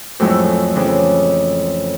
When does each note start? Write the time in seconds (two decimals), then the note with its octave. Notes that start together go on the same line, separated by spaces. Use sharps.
0.20 F2 A2 F#3 G#3 E4
0.75 F2 C#3 E3